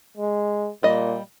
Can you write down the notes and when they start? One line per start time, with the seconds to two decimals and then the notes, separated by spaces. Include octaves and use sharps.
0.17 G#3
0.83 A#2 G3 D#5